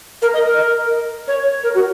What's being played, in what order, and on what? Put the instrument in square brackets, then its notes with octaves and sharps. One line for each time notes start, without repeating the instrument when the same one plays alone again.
[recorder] A#4
D#5
A#4
C#5
A#4
F#4